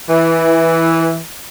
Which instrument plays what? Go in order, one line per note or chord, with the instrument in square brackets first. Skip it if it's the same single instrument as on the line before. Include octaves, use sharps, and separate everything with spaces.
[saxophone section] E3